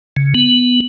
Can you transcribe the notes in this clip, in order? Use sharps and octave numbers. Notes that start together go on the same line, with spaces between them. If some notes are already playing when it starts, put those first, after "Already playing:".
C#3
B3